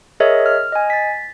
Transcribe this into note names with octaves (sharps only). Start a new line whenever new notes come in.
G#4 A#4 C#5 D#5 E5
F6
D#5 G#5
A6 B6